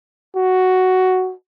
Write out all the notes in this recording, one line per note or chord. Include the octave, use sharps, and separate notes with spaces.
F#4